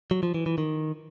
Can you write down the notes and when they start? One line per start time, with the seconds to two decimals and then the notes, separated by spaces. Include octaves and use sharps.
0.11 F#3
0.23 F3
0.34 E3
0.46 E3
0.58 D#3